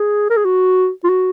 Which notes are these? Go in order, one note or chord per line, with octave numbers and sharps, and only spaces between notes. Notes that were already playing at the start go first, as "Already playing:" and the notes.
Already playing: G#4
A#4
G#4
F#4
F4
F#4